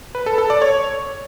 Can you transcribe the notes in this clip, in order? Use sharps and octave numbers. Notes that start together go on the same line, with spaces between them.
B4
A4
A4
D5
C#5